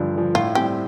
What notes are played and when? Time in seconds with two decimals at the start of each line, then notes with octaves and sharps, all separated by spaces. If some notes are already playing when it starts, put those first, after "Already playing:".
Already playing: G2 D3 F3
0.15 D3 F3
0.35 A2 F4
0.55 G3 C4 G4